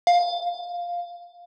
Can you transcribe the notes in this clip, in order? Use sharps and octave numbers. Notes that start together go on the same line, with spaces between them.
F5